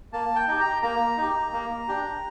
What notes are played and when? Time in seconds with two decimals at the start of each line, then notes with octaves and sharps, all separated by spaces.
0.13 A#3 A5
0.36 G5
0.48 D#4 G4
0.60 A#5
0.83 A#3 A#5
1.17 D#4 G4
1.53 A#3
1.88 D4 G4